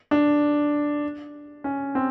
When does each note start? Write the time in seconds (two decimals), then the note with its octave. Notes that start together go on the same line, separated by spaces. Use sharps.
0.11 D4
1.64 C#4
1.95 C4